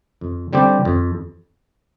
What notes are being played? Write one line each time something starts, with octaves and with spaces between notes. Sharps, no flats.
F2
D3 G3 C4 G4
F2